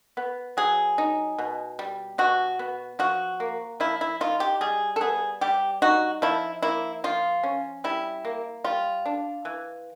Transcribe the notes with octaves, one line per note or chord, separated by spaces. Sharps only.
B3
F#3 G#4
D#4
B2
G3
B2 F#4
B3
F3 F#4
A#3
F3 E4
E4
D#4 F4
G4
G3 G#4
A4
B3 G#4
G3 G4
D#4 F#4
F3 E4
A#3 E4
F3 F4
C#4
G3 E4
A#3
G3 F4
D4
E3